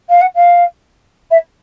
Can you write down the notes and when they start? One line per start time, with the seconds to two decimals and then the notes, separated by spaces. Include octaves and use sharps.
0.09 F5
0.21 F#5
0.35 F5
1.30 E5